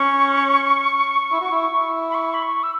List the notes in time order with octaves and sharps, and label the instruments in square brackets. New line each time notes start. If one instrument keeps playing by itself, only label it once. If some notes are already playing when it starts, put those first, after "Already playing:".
Already playing: [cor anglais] C#4 [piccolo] C#6
[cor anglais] E4
F#4
E4
E4
[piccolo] B5
C#6
B5
C#6
E6